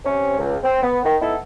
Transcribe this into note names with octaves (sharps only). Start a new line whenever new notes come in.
C3 C#4
C#2
C4
B3
D#3
B3 D#4 E4 A4